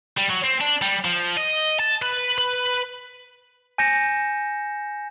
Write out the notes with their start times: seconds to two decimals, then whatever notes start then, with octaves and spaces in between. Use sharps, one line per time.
0.17 G3
0.29 F#3
0.44 C4
0.61 D4
0.82 G3
1.05 F3
1.37 D#5
1.80 A5
2.02 B4
2.38 B4
3.78 G#5 G6 A#6 C#7 E7